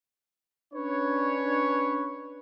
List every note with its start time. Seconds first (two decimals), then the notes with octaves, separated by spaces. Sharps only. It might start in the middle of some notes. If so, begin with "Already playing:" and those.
0.74 C#4 D4 B4 C#5